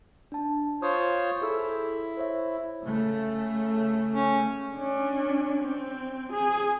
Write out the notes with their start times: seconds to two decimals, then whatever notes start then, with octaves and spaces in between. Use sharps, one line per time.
0.32 D4 A5
0.82 F4 C5 C#5 D#6
1.41 E4 G#4 A4 E6
2.17 C5 C#5 E5
2.84 C#3 A3
4.14 C#4
4.75 C#4 D4
5.64 C4
6.33 G#4